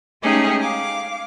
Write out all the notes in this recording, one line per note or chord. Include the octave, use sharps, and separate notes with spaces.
G#3 A3 C#4 D#4 G4 G#4
F5 D6